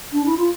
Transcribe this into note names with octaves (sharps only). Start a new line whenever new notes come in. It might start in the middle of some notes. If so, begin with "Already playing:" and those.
D4
E4
F4